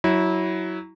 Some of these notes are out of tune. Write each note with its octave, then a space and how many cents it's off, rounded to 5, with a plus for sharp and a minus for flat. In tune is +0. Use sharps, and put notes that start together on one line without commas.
F#3 +5 E4 -20